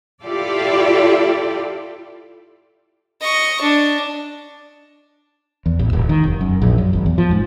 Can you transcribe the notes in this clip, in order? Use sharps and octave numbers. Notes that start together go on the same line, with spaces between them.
E4 F4 G4 A4 D5
D#5 C#6
D4
E2
A1
D1
D#3
F1
F#2
A#1
F#2
G#1
E2
F3
G#2